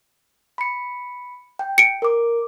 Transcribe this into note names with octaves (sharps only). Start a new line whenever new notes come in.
B5 C#7
G5
C#7 D7
A#4 D6